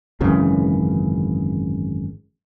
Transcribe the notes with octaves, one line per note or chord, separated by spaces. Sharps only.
G#1 F#2 C#3 E3